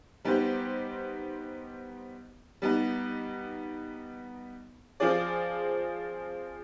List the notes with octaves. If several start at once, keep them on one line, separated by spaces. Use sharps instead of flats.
G3 B3 D#4 G4 C5
G3 B3 D#4
F3 C4 F4 G#4 D5